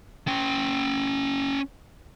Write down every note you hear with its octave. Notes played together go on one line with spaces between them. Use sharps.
C#4 G5